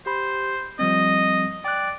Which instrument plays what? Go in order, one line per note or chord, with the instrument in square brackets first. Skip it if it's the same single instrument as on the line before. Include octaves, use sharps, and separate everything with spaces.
[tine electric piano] G4 B5 [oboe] C5
[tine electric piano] F3 G3 C4 [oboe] D#5
[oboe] D5 [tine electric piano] G5 F#6